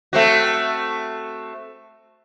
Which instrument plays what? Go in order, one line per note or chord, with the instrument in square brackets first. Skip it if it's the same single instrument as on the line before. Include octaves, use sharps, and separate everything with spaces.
[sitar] A3 C4 F#4